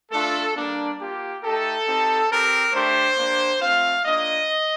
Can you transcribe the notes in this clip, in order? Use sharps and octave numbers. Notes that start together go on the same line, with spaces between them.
A3 D4 F4 A4
G3 A#3 D4
A#3 F4 G4
A3 D#4 G4 A4
C4 D#4 G4
C4 G4 A#4
A3 D4 G4 C5
A#3 D4 G4
A3 C4 F4 F5
A#3 D4 F4 D#5